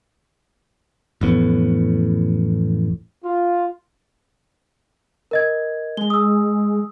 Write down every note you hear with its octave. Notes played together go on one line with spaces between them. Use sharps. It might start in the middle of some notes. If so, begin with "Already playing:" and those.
A1 F2 A2 B3
F4
A#4 D#5 G#6
G#3 G7
D#6 E6